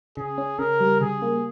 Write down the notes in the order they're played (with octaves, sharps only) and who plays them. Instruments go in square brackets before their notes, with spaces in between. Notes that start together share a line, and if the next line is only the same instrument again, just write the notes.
[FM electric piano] C#3 [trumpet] G#4
[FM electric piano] C#4
[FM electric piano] C#3 [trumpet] A#4
[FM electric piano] G3
[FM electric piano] C#3 [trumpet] G#4
[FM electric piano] A#3